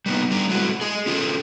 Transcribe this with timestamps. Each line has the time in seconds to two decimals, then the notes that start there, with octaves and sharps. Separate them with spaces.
0.06 G3 A#3 B3 D#4
0.31 G3 D4 A#5
0.49 G#3 A3 C4 E4 F#4
0.81 G#4 D#5
1.06 C#4 F4 G4 A4 A#4